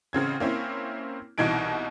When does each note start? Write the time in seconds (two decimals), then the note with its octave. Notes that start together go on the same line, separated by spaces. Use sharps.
0.13 A1 C#3 C4 G#6
0.40 A#3 C4 C#4 E4
1.38 C2 B2 E3 D#4 G#6 D7